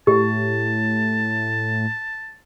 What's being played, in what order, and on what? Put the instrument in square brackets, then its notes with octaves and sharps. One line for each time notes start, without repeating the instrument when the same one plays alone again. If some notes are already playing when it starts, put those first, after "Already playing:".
[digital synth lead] A2 [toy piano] G4 [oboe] A5